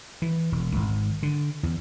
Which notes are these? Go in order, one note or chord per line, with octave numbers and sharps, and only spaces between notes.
E3
E1
G#1
D3
E2